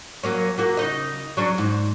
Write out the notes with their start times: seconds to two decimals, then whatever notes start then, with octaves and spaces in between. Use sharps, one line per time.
0.23 F#3 A#3 C#4
0.58 F#3 A#3 F#4
0.77 C#3 D#4 D#5
1.37 F#3 C#4 D4
1.58 G#2